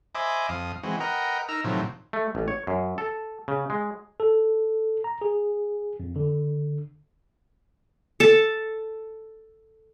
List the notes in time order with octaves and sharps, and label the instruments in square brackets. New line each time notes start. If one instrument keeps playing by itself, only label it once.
[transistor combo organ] C5 D#5 E5 G#5 B5 D6
F2 F5 D#6
E3 G#3 C4 F#4
A#4 B4 D#5 F#5 G5 A#5
D#4 A#4 A#5 E6 F6
A2 C3 D#3 F3 F#3
[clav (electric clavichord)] A3
A1
C#5
F#2
A4
C#3
G#3
[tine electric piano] A4
A#5
G#4
F2
D3
[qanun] A4 A5